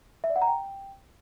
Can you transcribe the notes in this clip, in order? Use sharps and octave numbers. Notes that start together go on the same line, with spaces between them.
E5
D5
F#5
A#5
G5